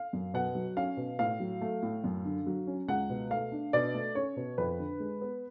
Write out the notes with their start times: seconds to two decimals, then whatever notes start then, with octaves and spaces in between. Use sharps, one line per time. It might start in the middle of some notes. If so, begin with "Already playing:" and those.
Already playing: F5
0.13 F#2
0.34 B2 F#5
0.55 F#3
0.76 C#4 F5
0.97 B2
1.19 A2 F5
1.40 F#3
1.61 A3
1.82 A2
2.04 F#2
2.25 D3
2.47 F#3
2.67 C#4
2.88 C#2 F#5
3.10 B2
3.30 A3 F5
3.52 D4
3.73 B2 D5
3.94 A3
4.15 C#4 C#5
4.37 B2
4.58 F2 B4
4.80 D3
5.00 G#3
5.21 B3